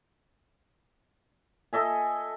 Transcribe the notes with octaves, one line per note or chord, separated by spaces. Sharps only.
A4 D#5 E5 G#5